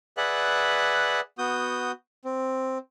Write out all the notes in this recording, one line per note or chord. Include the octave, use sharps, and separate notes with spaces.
G#4 B4 D5 E5 F#5 F#6
B3 F#4 D#6 G6
C4